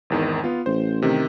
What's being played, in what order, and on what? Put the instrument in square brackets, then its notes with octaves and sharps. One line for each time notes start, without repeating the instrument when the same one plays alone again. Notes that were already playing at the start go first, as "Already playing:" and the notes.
[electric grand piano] G#1 E2 D#3
B3 F4
[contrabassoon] A1 [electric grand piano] C5
[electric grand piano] C3 D#3